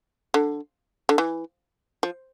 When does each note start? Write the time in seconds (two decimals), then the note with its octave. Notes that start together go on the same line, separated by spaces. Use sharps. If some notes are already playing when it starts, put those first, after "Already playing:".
0.34 D3
1.09 D3
1.18 E3
2.03 F3